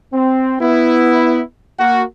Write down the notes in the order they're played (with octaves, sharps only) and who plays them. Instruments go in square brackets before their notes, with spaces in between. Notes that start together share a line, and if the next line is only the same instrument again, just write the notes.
[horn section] C4
B3 E4
A#3 F#4